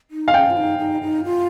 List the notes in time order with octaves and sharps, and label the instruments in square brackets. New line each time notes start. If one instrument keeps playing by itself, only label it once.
[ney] D#4
[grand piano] F5
[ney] C#4 [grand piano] G5
[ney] F4
D#4
D#4
D#4
F4